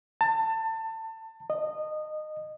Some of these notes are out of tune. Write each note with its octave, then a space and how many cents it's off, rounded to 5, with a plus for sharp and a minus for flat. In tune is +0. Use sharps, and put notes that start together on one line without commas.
A5 +25
D#5 -20